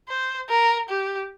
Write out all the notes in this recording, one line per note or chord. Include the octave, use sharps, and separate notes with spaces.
C5
A#4
G4